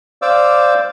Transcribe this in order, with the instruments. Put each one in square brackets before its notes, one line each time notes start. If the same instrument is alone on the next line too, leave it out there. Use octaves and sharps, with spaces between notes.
[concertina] C5 D5 F5 D6 E6